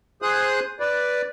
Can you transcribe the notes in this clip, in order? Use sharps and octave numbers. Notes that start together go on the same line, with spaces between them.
G#4 C5 D#6 F#6
B4 D5